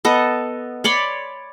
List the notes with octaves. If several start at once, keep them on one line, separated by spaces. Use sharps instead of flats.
B3 A4 D#5
C#5 D5 B5 C6